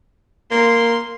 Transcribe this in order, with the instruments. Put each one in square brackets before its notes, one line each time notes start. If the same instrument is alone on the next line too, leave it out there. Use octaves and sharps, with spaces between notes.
[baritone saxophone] A#3 [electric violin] C6